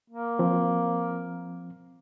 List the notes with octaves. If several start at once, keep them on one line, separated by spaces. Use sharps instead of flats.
A#3
F3 C4